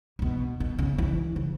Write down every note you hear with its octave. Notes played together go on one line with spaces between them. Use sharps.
C#3
B2
B2
C#3
E3
C#3